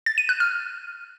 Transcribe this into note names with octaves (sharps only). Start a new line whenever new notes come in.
A6
D#7
F#6
F6